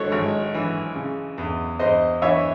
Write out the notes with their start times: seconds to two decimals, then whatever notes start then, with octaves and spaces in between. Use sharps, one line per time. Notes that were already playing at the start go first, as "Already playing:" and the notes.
Already playing: G#1 E4 F#4 A4 C#5
0.12 G#1
0.54 E3
0.95 C#3
1.38 E2
1.79 E2 C5 D#5
2.22 E3 C#5 E5